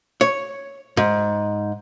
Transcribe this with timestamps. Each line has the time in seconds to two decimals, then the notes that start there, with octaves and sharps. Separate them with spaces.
0.21 C#5
0.97 G#2